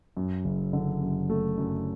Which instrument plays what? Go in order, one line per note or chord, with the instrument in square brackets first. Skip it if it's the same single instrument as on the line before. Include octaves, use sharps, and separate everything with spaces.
[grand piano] F#2
F#1
D3
F#2
A3
F#2